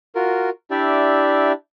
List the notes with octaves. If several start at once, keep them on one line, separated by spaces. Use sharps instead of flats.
F4 F#4 A#4
D4 E4 G4 D5 E5